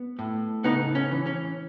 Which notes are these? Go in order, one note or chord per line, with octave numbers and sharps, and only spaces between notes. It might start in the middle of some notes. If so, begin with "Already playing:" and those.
Already playing: B3
A2
C#3 B3 D#4
C#4
E3
C#4